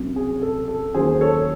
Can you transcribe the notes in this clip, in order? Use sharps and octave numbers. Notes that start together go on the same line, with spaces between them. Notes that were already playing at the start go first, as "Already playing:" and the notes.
Already playing: C2 C3 F#3 C#4
G#4
A4
A4
D#2 D#3 F#3 C#4 G#4 C5
A4 C#5